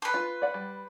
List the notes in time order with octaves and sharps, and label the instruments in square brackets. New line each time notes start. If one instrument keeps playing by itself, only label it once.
[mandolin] B4 C6
[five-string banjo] F4
D5 F#5
G3